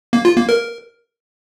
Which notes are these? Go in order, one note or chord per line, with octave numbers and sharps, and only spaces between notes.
A#3
F4
A#3
A#4